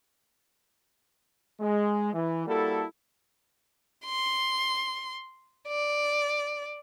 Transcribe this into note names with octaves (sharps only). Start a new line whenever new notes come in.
G#3
E3
G3 A#3 E4 F#4 A4
C6
D5